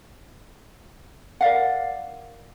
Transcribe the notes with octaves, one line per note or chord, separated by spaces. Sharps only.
A#4 D5 F5 F#5